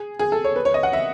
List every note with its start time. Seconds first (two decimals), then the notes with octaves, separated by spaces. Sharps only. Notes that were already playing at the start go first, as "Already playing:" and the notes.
Already playing: G#4
0.19 G#4
0.32 A4
0.44 C#5
0.56 B4
0.65 C#5
0.74 D#5
0.83 F#5
0.93 E5